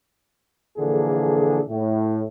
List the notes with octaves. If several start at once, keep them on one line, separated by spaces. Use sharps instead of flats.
A#1 D3 E3 A#3 G#4 A4
A2